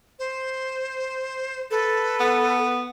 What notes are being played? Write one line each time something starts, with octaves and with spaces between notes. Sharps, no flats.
C5
A4 B4
B3